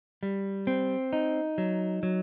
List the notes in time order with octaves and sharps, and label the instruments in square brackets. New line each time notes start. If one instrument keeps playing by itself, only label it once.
[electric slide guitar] G3
C4
D#4
F#3
F#3